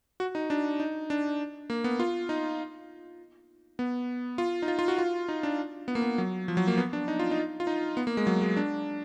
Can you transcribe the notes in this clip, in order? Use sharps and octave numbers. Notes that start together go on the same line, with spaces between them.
F#4
D#4
D4
D#4
D4
A#3
B3
F4
D#4
B3
F4
D#4
F4
F4
F#4
F4
D#4
D4
B3
A#3
B3
F#3
F3
F#3
A#3
B3
D4
D#4
F4
D#4
F4
D#4
B3
A#3
G#3
F#3
G#3
D4